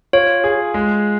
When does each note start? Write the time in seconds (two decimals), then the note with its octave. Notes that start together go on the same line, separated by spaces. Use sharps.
0.13 F4 C#5
0.44 G#4
0.74 G#3